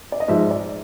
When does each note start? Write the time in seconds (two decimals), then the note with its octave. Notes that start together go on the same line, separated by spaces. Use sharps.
0.12 D5
0.20 D#5
0.28 G#2 F3 G#3 E5
0.51 D5